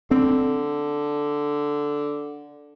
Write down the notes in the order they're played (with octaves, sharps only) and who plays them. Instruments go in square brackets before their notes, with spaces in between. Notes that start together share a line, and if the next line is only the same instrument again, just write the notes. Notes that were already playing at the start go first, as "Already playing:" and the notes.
[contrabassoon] D3 [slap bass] C4